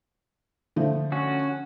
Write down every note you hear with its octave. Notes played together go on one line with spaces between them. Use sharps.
D3 F3 A3
C#4 F#4